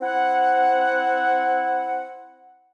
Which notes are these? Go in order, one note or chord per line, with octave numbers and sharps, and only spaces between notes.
C4 E4 F#5